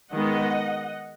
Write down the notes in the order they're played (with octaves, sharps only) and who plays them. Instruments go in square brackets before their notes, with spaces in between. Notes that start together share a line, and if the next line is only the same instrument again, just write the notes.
[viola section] D#3 G#3 B3 D#5 F#5